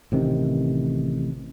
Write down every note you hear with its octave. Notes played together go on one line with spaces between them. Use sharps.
A1 C3 D#3